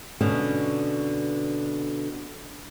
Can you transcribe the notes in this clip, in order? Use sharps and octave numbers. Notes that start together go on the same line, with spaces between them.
B2 D3 C#4